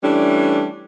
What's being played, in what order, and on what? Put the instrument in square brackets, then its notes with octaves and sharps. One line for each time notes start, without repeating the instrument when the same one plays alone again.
[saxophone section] E3 G3 A3 C#4 D4